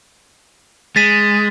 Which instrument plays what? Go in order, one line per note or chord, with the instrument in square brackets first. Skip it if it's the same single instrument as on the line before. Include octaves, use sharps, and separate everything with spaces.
[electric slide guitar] G#3 [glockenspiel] A6 B6 D#7